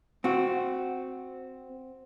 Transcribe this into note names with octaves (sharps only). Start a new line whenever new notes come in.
C4 F#4